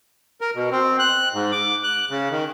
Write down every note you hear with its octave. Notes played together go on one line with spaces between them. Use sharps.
A#4
B2
C4
F#6
G#2
D6
F#6
C#3
D#3